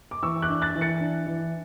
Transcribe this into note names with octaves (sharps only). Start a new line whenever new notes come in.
D6
E3 C#6 E6
D6 F#6
D4
F#6 A6
E3
A6 C#7
D4
E3